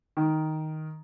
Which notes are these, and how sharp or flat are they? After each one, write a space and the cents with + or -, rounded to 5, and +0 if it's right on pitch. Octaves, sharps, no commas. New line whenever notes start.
D#3 +5